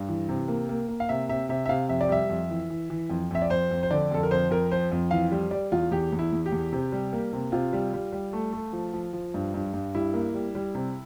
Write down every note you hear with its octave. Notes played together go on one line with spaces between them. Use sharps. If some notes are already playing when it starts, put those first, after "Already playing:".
Already playing: G2
E3
C3
A#3
A#3
A#3
F5
C3 E5
C3 E5
C3 E5
E5
C3 F5
F2 E5
D5
G3 E5
F2
E3
E3
E3
F2
F2 E5
D5
F2 C5
F2
C5
D3 D5
F2 A4
A#4
F2 C5
F2 A#4
F3 C5
F2
E3 F5
G3
G3 D5
E2 F4
E2 G4
E2
E4
E2
G4
E2
C3
G3
A#3
C3
C3 F4
G3
G3
G3
A3
A3
F3
F3
F3
G2
G2
G2
G3 E4
A#3
G3
G3
C3